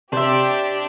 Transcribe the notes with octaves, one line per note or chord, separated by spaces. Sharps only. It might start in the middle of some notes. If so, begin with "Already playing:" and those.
C3 D4 G4 C5 E5